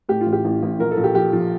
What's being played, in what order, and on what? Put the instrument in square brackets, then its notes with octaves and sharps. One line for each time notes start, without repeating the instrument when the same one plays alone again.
[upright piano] A2 G4
F4
A1
G4
A1
A1
A#1 A#4
A4
A#1
G4
F3 G4
F3